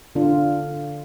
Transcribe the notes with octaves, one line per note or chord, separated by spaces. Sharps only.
D3 D4 F4